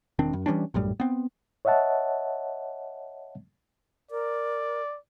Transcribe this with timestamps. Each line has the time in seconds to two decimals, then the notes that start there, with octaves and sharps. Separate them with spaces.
0.19 E1 D#3 C4 D4
0.33 F#2
0.46 E3 G3 C#4 D4
0.74 A#1 F#2 A2 G3
1.00 B3 C4
1.65 C#5 D#5 E5 F#5 A5
4.11 A#4 D5